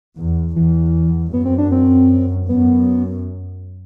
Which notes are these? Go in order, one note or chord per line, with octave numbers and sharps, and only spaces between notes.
E2
E2 E3
F#2 B3
C4
D4
C4
F#2 B3